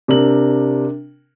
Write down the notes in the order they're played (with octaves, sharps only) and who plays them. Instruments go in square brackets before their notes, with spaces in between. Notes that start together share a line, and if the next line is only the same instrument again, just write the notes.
[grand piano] C3 D4 A#4 F#7